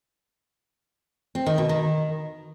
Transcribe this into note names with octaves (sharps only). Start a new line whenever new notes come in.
C4
D#3
B2
D#3